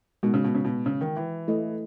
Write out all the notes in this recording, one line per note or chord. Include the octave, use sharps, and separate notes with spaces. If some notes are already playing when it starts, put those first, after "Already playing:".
B2 G#3 D#4 F#4
C#3
B2
C#3
B2
C#3
D#3
E3
A3 E4 A4 D#5